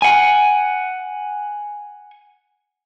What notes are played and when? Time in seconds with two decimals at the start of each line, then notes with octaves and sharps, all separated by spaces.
0.02 F#5 G#5